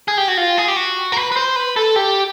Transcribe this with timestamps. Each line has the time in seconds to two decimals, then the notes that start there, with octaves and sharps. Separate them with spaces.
0.08 G#4
0.17 G4
0.28 F#4
0.37 F4
0.58 G#4
0.68 G4
0.77 F#4
1.12 A#4
1.17 B4
1.32 B4
1.36 C5
1.56 B4
1.76 A4
1.96 G4